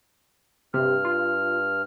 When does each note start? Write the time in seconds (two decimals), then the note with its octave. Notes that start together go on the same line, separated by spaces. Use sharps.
0.74 G2 C3 F6
1.05 F4